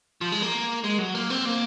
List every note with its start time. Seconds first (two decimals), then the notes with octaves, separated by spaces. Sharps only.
0.21 F3
0.32 G#3
0.42 A#3
0.84 G#3
0.99 F#3
1.15 A#3
1.30 C4
1.45 A#3